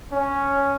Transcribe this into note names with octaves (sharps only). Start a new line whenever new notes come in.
C#4